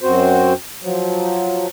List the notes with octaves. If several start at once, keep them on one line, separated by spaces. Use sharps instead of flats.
F#2 C4 F#4 C5
F3 F#3